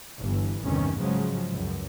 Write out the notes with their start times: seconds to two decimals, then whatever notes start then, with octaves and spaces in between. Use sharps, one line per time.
0.20 G1 E3
0.62 A1 E2 G2 C3 D#3 C#4
0.99 G#2 C#3 F3 F#3 G#3
1.51 C#2 F#2